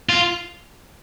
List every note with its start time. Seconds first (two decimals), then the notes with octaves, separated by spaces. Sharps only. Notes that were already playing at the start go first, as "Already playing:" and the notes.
0.09 F4